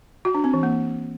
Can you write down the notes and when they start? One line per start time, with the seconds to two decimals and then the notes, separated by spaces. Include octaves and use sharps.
0.25 F#4
0.34 D4
0.44 C4
0.53 E3
0.63 A#3